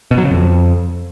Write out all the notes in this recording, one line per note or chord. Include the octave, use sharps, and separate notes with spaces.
B2
F#3
C#3
F2